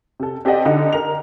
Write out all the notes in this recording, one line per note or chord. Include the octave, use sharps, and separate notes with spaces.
C3 A4
C4 G4 A4 D5 D#5 F#5
D3 D#4
A#4 F7